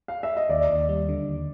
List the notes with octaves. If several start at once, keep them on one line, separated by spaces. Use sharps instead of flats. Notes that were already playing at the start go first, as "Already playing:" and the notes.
F5
E5
D#5
D#2 D5
D#2
G3
D3
D#2